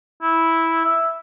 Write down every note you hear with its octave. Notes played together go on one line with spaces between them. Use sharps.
E4
E5